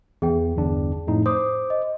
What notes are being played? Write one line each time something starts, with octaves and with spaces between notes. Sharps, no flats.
E2 G#4 G5
G1 E2 D4
F2 A2 D#4
C5 D6 D#6
D#5